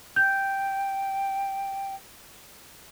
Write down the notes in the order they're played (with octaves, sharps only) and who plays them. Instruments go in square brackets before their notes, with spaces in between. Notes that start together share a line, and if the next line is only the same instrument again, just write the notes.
[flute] G5 [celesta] G6